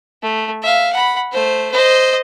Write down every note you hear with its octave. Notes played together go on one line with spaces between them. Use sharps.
A3
E5 F5
F#5 B5
A3 C5
C5 D#5